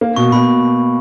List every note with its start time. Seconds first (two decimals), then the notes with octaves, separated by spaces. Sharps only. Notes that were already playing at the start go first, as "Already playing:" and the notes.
0.01 A#3
0.16 B2 C#6
0.32 B2 B5